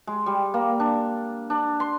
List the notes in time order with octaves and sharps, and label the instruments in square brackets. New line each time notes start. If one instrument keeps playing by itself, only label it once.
[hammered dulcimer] G#3
G3
A#3
D4
D4
C6